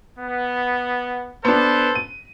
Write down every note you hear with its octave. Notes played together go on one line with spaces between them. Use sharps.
B3
B3 D4 A4 B4 C5
D#7